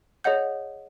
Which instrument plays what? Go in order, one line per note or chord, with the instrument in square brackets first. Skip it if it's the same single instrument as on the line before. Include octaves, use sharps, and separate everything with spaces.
[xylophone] G#4 C#5 D#5 F#5 G6